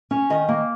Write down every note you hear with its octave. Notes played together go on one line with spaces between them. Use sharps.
C#4
D#3 D#5
A#3